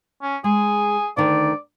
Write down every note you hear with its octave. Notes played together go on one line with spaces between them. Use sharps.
C#4
G#3 G#4
D2 D3 D#3 D5